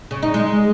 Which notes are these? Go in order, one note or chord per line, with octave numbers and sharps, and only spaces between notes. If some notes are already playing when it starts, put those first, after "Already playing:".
C#3
D#4
G#3